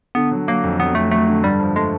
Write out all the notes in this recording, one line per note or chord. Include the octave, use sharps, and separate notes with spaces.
D3 B3
F#3
F#3 A#3
F2
F#3 B3
F2 A3
F#3 A3
D3
G2 G3
F3
G#3 A3